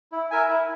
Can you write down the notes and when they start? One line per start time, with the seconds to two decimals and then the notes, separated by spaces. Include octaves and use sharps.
0.12 E4
0.31 A#4 E5 G#5
0.49 E4